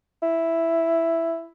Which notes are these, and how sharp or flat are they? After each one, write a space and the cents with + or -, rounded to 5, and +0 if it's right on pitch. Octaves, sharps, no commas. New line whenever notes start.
E4 +5